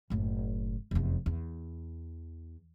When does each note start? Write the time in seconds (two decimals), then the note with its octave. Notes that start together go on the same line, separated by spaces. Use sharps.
0.10 F#1 A2
0.91 F1 E2
1.26 E2